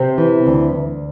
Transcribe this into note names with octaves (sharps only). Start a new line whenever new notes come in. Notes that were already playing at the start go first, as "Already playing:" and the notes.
Already playing: C3 C4
E3
D2
D2